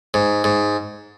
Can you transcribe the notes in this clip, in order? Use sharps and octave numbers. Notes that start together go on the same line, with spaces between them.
G#2
G#2